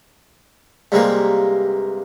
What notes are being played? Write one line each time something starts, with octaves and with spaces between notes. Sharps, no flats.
G2 C3 G#3 A#3